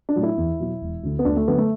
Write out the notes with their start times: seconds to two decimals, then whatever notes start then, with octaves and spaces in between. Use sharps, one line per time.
0.09 D4
0.16 A2 F#3
0.23 E4
0.37 E2
0.60 B2 F#3
0.81 E1
1.03 D2 D3
1.19 B3
1.25 D2 D4
1.37 A3
1.47 D3 F#3 B3
1.58 A3